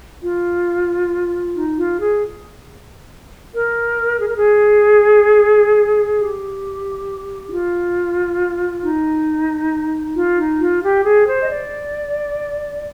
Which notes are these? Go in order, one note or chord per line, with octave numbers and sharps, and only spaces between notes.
F4
D#4
F4
G#4
A#4
G#4
A#4
G#4
G4
D#4
F4
D#4
F4
D#4
F4
G4
G#4
C5
D#5
D5